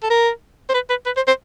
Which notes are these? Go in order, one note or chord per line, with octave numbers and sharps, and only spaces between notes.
A4
A#4
C5
B4
B4
B4
C5
C5